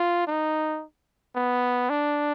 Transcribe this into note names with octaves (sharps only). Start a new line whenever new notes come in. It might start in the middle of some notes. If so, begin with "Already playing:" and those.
Already playing: F4
D#4
B3
D4